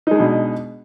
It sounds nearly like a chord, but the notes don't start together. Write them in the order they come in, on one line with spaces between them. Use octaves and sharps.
D#4 G#3 D4 B2